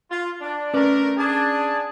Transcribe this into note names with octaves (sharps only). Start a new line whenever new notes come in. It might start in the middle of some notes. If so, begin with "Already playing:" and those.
F4
D4
A3 C#4 D4 A#4 B4 D5
D4 G#4 A5